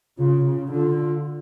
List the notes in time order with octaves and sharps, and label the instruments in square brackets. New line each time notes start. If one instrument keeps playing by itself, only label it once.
[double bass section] C#3 [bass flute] F4
[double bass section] C#3
[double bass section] D3 [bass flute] F4